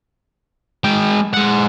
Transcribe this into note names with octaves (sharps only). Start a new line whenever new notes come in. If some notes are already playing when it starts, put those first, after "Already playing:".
G#3 G5
G#3 F#5